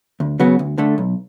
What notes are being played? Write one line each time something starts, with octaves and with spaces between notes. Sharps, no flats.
D2
C#3 F#3 B3 F#4
D2
D3 A3
B1